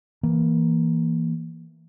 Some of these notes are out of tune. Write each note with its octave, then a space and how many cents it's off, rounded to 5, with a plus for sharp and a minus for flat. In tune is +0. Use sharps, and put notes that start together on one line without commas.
E3 +0 A#3 +0